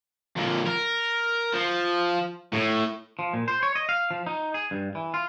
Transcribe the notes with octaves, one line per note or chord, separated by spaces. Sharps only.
F2 A#2
A#4
F3
A2
F3
A#2
C5
C#5
D#5
F5
F3
D#4
G#4
G2
E3
F4